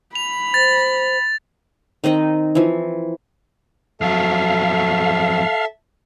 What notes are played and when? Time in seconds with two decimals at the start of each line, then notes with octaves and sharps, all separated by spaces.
0.15 B5 F7
0.54 C5 A6
2.04 D#3 C4 D#4 D#5
2.55 E3 F3
4.01 F2 F#3 A4 E5 F5